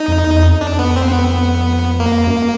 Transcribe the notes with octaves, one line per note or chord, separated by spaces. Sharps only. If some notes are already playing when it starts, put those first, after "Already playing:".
Already playing: D#4
F2
E2
F2
D4
B3
C4
B3
A#3
F#2